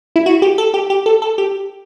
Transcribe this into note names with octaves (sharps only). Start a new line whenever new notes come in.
E4
F#4
G4
A4
G4
G4
A4
A4
G4